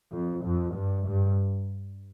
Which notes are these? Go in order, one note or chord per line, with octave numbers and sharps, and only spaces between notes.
F2
F2
G2
G2